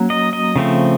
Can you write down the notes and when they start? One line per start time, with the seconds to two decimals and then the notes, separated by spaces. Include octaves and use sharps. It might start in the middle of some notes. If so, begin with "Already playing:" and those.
Already playing: F#3 A#3 C#4
0.10 D#5
0.33 D#5
0.56 C#3 F3 A3 C4